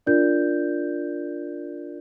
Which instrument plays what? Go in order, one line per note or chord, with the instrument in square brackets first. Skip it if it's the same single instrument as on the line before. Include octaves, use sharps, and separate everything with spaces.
[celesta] D4 F4 A#4 D5 G6